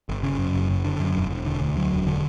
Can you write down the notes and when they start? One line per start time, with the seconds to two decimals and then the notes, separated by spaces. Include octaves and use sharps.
0.09 G1
0.23 C#3
0.38 F#2
0.54 F#1
0.70 F#1
0.84 D3
1.00 F#2
1.16 E1
1.31 E1
1.46 D3
1.61 D2
1.77 F#3
1.92 E1
2.07 D3